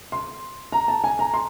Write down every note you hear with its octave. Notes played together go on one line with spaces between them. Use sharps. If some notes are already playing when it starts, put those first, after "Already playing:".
C6
A#5
A5
G#5
A#5
C6